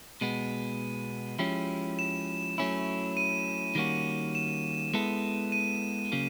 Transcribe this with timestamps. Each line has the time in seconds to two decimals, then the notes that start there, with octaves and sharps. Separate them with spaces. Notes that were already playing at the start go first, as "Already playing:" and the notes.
0.21 B2 G#3 B3 D#7
1.39 F3 G#3 C#4 E4 G4
1.99 E7
2.58 F#3 A3 C#4 E4
3.17 D#7
3.75 D#3 G3 A#3 C#4 F#4
4.35 E7
4.94 G#3 B3 E4 A4
5.52 D#7
6.12 C#3 F#3 A#3